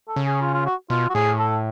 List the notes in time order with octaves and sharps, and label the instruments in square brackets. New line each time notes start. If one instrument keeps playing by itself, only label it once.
[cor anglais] A4
[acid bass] C#3
[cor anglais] G#4
F4
F4
F#4
[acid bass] B2 [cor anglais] F4
[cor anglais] F#4
[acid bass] A2 [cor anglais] G#4
[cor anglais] A4